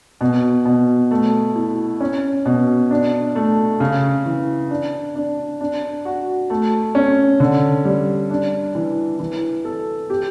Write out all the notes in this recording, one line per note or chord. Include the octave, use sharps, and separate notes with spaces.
B2
B2
A3
E4
C#4
B2
D4
A3
C#3
E3
D4
D4
D4
F#4
A3
C#4
D3
G3
D4
E3
E3
A4
G4